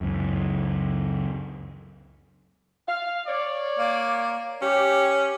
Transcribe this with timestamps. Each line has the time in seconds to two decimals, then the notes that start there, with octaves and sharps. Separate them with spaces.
0.01 C#2 F#2
2.88 F5
3.27 C#5 D5
3.79 A#3
4.62 C#4 G4